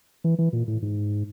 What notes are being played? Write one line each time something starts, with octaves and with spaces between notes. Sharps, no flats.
E3
E3
A#2
A2
G#2